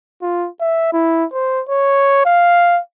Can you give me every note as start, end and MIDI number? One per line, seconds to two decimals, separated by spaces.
0.22 0.48 65
0.61 0.92 76
0.93 1.25 64
1.33 1.62 72
1.69 2.25 73
2.25 2.80 77